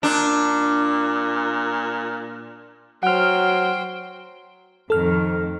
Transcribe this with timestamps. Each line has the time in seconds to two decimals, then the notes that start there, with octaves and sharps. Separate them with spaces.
0.03 A#2 D4
3.03 F#3 C5 F#5 G5 F6
4.90 F2 A2 D#3 A4 F6